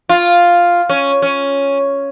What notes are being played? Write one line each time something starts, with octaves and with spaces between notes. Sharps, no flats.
F4
C#4
C#4